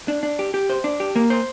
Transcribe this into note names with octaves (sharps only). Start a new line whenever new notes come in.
D4
D4
G4
G4
C5
D4
G4
A#3
C5